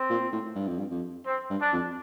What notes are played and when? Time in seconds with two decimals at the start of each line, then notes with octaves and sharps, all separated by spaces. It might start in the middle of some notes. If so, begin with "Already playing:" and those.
Already playing: C4
0.10 A#2
0.32 A2
0.56 G2
0.68 F2
0.79 G2
0.91 F2
1.26 C4
1.50 G2
1.61 D4
1.73 F2